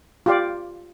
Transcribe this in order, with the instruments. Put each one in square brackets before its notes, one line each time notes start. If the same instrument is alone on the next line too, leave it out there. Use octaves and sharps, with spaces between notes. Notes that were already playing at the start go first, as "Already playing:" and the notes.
[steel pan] F4 G4 D5